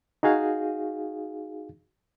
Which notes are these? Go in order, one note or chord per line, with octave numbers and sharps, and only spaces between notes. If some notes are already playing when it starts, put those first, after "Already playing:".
D#4 F#4 G#4 F5